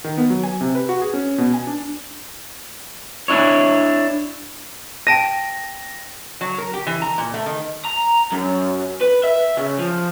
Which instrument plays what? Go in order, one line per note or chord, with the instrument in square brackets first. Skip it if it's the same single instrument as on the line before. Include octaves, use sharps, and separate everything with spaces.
[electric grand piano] D#3
B3
F#3
G#5
C3
B4
F#4
G#4
C#4
B2
G#5
D4
[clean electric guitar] D4 E4 C#5
[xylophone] G5 A5 D#7 [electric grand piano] A#6
[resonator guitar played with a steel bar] F#3
A#4
G4
E3
A#5
A#2
A3
D#3
[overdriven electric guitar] A#5
F#2
B4
E5
C#3
F3